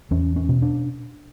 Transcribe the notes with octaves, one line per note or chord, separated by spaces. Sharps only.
E2 C#4
C#4
B2
D4